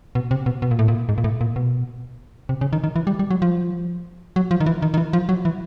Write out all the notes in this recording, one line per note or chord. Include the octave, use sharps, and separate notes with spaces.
B2
C3
B2
B2
A#2
A2
A#2
G#2
A#2
A2
A#2
B2
C3
C#3
D#3
D#3
E3
G3
G3
F#3
F3
F#3
F3
D#3
E3
D#3
D#3
E3
F3
F#3
E3